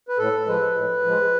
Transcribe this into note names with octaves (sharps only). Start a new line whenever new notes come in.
B4
A2 A4
F3 G#3 B4
A2
F3 G#3